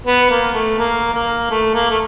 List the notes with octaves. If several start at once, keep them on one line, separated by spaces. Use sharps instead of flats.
B3
A#3
A3
A#3
A#3
A3
A#3
A3